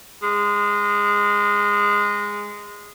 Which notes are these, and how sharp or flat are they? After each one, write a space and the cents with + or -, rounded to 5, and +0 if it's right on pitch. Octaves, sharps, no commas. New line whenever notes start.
G#3 -15